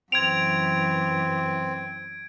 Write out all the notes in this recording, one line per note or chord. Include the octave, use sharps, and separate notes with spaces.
F#2 E3 C4 G#6 D7 F7